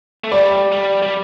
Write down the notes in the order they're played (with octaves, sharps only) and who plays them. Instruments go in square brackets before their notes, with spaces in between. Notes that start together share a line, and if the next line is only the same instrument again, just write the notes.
[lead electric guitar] A3
[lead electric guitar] G3 [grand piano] D5
[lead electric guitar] G3
G3